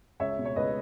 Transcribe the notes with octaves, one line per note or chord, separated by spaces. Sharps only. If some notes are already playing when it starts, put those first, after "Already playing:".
C#2 C#5 E5
B2
C#5
C#2 B4 D#5